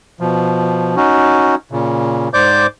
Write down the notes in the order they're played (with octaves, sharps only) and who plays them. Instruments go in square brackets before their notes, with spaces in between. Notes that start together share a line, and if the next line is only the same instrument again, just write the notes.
[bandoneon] B2 F3
C#4 D#4 F#4
A#2 C#3
G#2 C5 D5 D6 G6